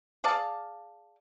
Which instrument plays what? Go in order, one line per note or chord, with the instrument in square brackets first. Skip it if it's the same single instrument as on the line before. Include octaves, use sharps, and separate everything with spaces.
[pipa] G#4 D5 F5 A5